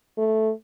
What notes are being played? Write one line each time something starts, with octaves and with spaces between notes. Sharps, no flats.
A3